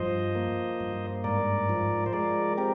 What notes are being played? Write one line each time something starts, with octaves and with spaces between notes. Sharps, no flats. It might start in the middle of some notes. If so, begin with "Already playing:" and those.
Already playing: G2 F3 C5 D#5
A#3
G2
G#2 A#4 D5
F3
C5
G#3 A#4 D5
C4 G4 A#4